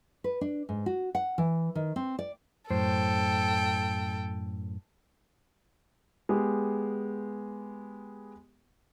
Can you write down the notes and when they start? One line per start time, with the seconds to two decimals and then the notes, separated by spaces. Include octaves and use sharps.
0.24 B4
0.41 D4
0.69 G#2
0.86 F#4
1.15 F#5
1.38 E3
1.75 D#3
1.96 C4
2.19 D5
2.70 F#2 A2 A4 C5 G5
6.29 G#3 B3 G4 G#4